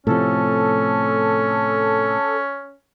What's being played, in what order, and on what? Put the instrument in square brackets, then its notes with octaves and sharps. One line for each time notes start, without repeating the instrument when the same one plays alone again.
[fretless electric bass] A2 C3 F3 [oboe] C#4 [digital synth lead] A4